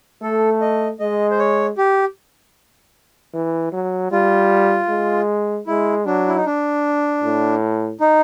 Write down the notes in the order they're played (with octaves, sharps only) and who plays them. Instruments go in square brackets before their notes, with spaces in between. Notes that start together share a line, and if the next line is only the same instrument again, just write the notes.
[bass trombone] A3 [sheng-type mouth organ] A4
[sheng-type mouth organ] D#5
[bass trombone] G#3 [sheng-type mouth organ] D#5
[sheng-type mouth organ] C5
C#5
G4
[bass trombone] E3
F#3
[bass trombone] G3 [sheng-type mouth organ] F4
[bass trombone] G#3
[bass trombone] G#3 [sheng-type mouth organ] E4
[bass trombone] F#3 [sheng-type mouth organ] D4
[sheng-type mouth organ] E4
D#4
D4
[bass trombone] A2
[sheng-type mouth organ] D#4